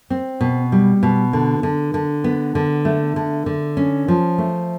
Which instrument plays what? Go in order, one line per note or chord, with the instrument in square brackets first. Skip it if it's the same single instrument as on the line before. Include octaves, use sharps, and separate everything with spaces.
[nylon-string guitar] C4
B2
G3
B2
D3
D3
D3
B3
D3
A3
D3
D3
C#4
F3
A3